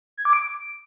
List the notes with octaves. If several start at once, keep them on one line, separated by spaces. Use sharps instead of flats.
G#6
D6
D7